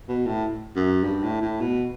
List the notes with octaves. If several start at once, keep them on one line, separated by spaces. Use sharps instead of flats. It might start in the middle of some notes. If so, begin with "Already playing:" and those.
B2
A2
F#2
G2
A2
A2
B2